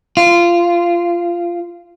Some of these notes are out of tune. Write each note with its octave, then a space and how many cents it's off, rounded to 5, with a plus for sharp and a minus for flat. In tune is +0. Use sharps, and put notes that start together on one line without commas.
F4 -15